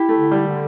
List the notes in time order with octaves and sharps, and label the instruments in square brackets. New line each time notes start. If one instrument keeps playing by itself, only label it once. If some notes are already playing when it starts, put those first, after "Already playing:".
Already playing: [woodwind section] E4 [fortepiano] G4
[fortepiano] A3
[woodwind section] D3
[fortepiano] G3
[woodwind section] D3